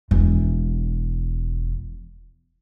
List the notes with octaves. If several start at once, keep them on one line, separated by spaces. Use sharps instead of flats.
E1 E3